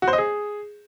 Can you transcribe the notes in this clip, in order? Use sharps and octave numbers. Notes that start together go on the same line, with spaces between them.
F#4
C5
D#5
G#4